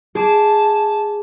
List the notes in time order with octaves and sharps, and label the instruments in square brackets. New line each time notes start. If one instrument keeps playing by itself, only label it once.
[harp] G#4 D6 [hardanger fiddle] A5